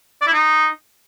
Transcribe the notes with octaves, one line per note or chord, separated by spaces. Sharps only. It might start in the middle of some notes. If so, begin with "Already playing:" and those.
D5
E4
D#4